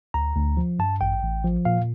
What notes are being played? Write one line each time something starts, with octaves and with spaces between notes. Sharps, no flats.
D2 A#5
D2
F3
G2 A5
A1 G5
A1
F3
A#2 F5